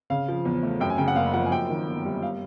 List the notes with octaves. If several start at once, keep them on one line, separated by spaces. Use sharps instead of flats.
C#3 F5
F3
E2
A3
F#2 G5
G#5
C#3 G5
F#5
F#1 F5
F3 F#5
G#5
F#2 G5
D#3
G1
G3
F5